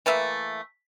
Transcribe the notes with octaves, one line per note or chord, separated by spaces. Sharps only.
E3 A3 A#3 E5